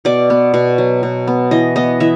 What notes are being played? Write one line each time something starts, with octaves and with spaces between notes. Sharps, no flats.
B2 D5
B3
B2
F#3
B2
B3
E3 D#5
B3 D#5
E3 E5